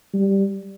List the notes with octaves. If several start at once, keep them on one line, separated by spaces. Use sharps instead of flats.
G3